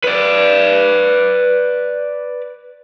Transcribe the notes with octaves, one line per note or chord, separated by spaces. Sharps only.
B4 D5